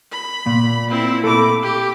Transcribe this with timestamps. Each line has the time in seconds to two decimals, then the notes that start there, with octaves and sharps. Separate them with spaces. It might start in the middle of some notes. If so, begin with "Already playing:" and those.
0.12 B5
0.46 A#2
0.89 C4 E4
1.24 A3 A4 B5 D6
1.62 G4